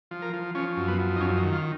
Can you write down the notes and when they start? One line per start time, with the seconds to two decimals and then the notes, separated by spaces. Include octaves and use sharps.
0.11 F3
0.22 A#4
0.33 F3
0.55 F3 C#4
0.77 F#2
0.88 B3
0.99 F3
1.16 D#4
1.20 F#2 C#4
1.37 D#4
1.43 D#3
1.53 F4